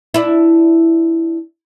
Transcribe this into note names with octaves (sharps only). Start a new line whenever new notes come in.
D4 E4